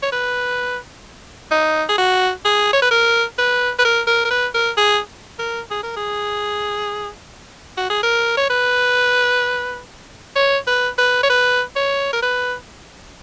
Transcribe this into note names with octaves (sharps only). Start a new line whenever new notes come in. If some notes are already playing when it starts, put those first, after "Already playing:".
C#5
B4
D#4
G#4
F#4
G#4
C#5
B4
A#4
B4
B4
A#4
A#4
A#4
B4
A#4
G#4
A#4
G#4
A#4
G#4
F#4
G#4
A#4
C#5
B4
C#5
B4
B4
C#5
B4
C#5
A#4
B4